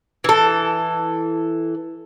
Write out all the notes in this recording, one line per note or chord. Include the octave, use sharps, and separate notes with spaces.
E3 A4